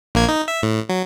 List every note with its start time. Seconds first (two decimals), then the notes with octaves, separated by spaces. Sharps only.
0.15 A#1 A#3 G#6
0.28 D#4
0.48 E5
0.63 A2
0.89 F#3